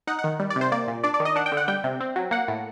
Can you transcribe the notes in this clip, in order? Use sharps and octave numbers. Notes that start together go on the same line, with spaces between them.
D#4 F#5
F#5
D#3
G3
D5
C3
C5
A#3 D5
A#2
D4 D5
D5
D#3
D#5
D4 F#5
G5
D3
F#5
G3 G5
C3
C4
F#3
A#3 F#5
A2